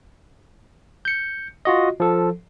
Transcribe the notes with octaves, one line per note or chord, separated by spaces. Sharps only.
G6 C#7
F4 F#4 D#5
F3 A4